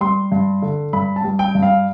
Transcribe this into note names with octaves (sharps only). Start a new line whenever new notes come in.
G3 C6
G2
D3
G2 B5
A5
G3
G5
G2
F5